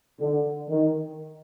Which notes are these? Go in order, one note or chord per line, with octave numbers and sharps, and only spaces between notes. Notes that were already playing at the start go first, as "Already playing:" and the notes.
D3
D#3